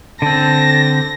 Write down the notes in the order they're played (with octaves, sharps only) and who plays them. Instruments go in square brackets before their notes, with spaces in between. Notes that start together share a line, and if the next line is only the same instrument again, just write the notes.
[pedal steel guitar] D3 C4 [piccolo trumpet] A5 [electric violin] A#6